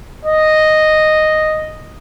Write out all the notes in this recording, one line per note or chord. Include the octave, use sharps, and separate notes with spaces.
D#5